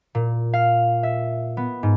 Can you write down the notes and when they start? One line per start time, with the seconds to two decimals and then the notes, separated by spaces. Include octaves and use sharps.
0.15 A#2
0.54 F5
1.03 E5
1.57 B3
1.83 G#2